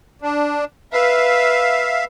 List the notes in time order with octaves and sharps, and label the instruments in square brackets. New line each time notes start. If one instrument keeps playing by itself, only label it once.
[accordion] D4
[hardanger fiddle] B4 [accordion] E5 F5